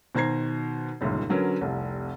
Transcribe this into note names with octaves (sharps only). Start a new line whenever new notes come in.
B2 D#3 C5 A#5 G#6 C7
G1 C#2 F#2 A#2 D#3
D3 F#3 C#4 A#4 B4
F1 C2